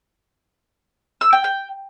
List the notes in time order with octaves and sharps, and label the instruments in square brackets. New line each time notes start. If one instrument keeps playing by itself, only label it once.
[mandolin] E6
G5
G5